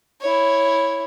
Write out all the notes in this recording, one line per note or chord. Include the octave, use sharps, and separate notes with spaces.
E4 C#5